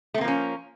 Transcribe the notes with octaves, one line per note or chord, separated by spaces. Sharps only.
F3 A3 A#3 C4 C#4